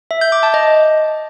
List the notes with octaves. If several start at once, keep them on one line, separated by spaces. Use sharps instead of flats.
E5
G6
D6
A5
D#5